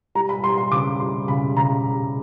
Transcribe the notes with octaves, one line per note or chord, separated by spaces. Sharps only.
G3 A#5
B5
G3 C6
C6
C#3 D6
G3 C6
C#3 B5
C#3 A#5